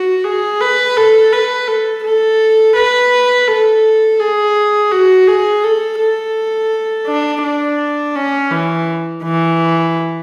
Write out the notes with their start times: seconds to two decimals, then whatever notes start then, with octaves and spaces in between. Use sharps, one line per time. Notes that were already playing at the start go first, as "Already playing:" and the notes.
Already playing: F#4
0.24 G#4
0.61 B4
0.97 A4
1.32 B4
1.68 A4
2.04 A4
2.76 B4
3.47 A4
4.20 G#4
4.92 F#4
5.28 G#4
5.64 A4
5.99 A4
7.07 D4
7.43 D4
8.16 C#4
8.51 E3
9.23 E3